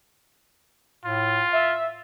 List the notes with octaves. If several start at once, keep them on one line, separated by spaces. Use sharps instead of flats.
A2 F4
E5